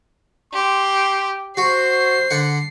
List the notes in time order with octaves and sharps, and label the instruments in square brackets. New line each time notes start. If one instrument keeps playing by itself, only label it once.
[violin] G4 [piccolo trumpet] C6
[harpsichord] F#4 [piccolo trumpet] C5 [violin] C7
[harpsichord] D3 F#5